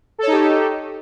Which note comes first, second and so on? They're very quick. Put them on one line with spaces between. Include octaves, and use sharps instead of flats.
A4 C#5 D#4 G4